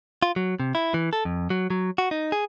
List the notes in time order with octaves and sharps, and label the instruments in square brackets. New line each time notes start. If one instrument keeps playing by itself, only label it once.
[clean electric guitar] F4
F#3
C3
E4
E3
A4
F2
F#3
F#3
F#4
D#4
G#4